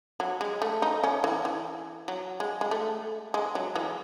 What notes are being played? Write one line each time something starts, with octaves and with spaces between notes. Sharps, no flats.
F#3
G#3
A3
D#4
C#4
E3
E3
F#3
G#3
G#3
A3
G#3
F#3
E3